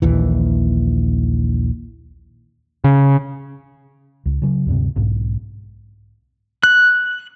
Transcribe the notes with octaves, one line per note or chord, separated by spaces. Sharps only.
A#1 D#2 E3
C#3
C#2
C#3 F#3
D2 G2 C3
B1 G#2
F#6